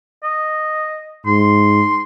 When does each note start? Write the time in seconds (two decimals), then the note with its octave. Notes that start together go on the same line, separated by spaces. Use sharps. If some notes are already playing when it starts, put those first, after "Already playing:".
0.23 D#5
1.26 G#2 C6